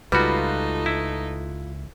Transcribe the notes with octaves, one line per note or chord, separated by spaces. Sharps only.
C#2 G3 A3 D#4 F4 F#4 B4
E4